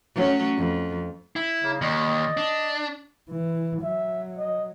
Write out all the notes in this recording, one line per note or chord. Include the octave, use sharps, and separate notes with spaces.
F#3 A3 C#4
F2
E4
C#3 F#3 A#3
D#2 D5 D#5
D4
E3
F#3 E5
D#5